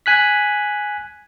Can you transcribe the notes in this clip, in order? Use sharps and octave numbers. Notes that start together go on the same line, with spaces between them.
G#5 F#6 B6